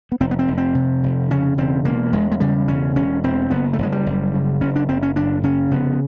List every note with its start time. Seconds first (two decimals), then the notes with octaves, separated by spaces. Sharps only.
0.12 B3
0.20 F1 C4
0.31 B3
0.39 C4
0.48 F1
0.58 C4
0.75 C3
1.03 F1
1.31 C#3 C#4
1.58 E1 C4
1.85 E1 A#3
2.12 E1 G#3
2.32 G#3
2.40 C#3 G3
2.68 E1 C#4
2.96 E1 C#4
3.23 E1 C4
3.50 F#1 B3
3.73 A3
3.78 F#1 G#3
3.92 G3
4.06 F#1
4.34 C#3
4.61 F#1 C#4
4.76 D4
4.89 F#1 C4
5.03 C#4
5.16 F#1 D4
5.43 C#3 C#4
5.71 F1 B3